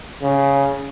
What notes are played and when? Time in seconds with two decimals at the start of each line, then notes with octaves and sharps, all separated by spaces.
0.22 C#3